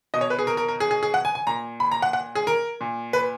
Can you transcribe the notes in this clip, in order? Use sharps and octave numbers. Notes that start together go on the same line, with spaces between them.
B2 D#5
C#5
B4
G#4
A#4
A#4
A#4
G#4
G#4
G#4
F#5
G#5
G#5
A#2 A#5
B5
A#5
F#5
F#5
G#4
A#4
A#2
B4